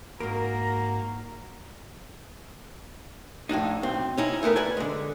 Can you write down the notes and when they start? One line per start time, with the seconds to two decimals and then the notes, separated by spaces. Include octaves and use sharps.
0.20 G#2 A#3 F#4 A#4 A#5
3.49 F2 A2 D4 D#4
3.83 B1 C4
4.18 C#4 D#4 E4
4.43 A3 B3 A#4 B4
4.56 B4 D5 G#5
4.77 D3 G#3